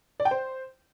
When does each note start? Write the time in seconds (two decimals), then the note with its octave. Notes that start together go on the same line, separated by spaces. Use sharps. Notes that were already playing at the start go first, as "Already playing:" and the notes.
0.20 D5
0.25 G5
0.31 C5